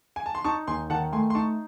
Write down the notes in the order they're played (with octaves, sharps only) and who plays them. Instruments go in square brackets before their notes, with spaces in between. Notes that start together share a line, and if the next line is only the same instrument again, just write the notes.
[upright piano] G#5
A5
C6
[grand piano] D#4 [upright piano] A5 C#6
[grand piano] D#2 [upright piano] G#5 C6
[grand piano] D#3 [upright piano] F#5 A5
[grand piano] A3 [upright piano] G#5 C6
[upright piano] C6
[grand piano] D#4 [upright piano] A5 C#6